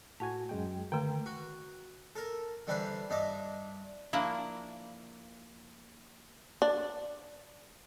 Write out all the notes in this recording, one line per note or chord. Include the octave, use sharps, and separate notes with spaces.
A2 F#4 G#5 A5
F#2 G#3 G5
D3 D#3 A3 G5
F#4
A4 A#4
D3 E3 G3 D4 B4 C5
G2 D4 D#5 E5 D6
F3 A#3 D4 E4
D4